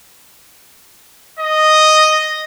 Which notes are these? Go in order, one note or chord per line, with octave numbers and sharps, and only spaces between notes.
D#5